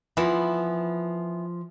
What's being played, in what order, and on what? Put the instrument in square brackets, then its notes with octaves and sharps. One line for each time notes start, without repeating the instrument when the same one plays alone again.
[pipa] E3 B3 [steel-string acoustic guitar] F3